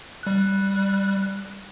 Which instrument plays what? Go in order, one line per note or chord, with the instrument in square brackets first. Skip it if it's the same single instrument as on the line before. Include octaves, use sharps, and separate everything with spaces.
[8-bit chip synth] G3 F#6